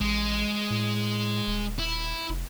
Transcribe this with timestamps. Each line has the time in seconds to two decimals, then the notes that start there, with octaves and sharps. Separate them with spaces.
0.01 A1 G#3
0.70 A2
1.47 D#1
1.79 E4
2.29 F1